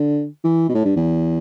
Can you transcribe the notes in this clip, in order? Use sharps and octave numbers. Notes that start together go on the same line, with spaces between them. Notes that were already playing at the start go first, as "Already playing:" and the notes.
Already playing: D3
E3
B2
A2
G2
E2